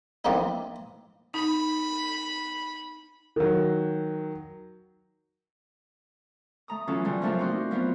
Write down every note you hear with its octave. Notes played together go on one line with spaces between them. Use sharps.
E3 F3 A#3 C4 D4 D#4
D#4 B5
D#3 F#3
A3 A#5 D#6
E3 F#3 C#4 F4 A4
C#3 F#3 G3 A3
F3 F#3 A3 A#3 D4 F4
C4 D#4 F#4 C5
F3 F#3 B3 F4